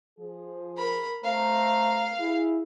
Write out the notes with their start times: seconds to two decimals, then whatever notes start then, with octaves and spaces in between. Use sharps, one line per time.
0.19 F3 G#4
0.77 A#4 B5
1.24 A3 C5 F5 A#5
2.20 E4 G#4